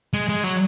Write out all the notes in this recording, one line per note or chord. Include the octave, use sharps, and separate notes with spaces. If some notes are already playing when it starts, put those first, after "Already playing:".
G#3
G#3
F#3